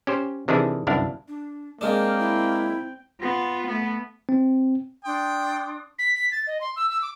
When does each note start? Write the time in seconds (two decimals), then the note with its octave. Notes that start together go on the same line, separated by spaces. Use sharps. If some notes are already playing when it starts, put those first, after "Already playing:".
0.07 C#4 G4 C5
0.48 C3 D#3 E3 D4 E4 G#4
0.87 G1 C2 F#2 D4 E4 F5
1.28 D4
1.81 G#3 A#3 C4 D4 A#4 G5
2.19 E4
3.21 B3 F4
3.67 A3 B3
4.29 C4
5.05 D4 G5 C6 D#6
5.99 B6
6.15 B6
6.32 A6
6.47 D#5
6.61 C6
6.76 E6
6.90 E6
7.02 D6